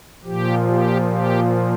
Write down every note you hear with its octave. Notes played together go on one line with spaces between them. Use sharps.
A#2 F3 G4
G4
G4